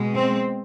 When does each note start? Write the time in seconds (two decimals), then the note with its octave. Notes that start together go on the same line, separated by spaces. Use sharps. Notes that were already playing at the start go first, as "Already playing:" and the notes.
Already playing: B2 G#3
0.12 C4